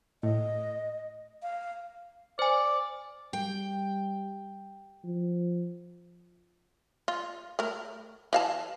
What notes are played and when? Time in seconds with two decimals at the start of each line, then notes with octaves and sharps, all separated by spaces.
0.23 A2 D#5
1.42 F5
2.39 C5 D5 G#5
3.33 G3 G5
5.04 F3
7.08 F4
7.59 A3 A#4
8.33 E3 F5 A5